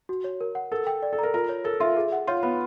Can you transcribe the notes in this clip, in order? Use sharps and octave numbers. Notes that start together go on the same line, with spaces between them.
F#4
C#5
A#4
F#5
A4 A#4
G5
D5
A4
A#4 A#5
F4 A#4
C#5
A4 A#4
F4 E5
G#4
F#5
F4 C#5
B3 B5